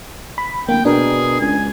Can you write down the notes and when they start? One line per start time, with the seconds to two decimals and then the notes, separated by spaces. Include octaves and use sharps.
0.38 B5
0.69 D1 A#3 G5
0.85 B2 D4 G#4 A#4
1.40 C#2 G#5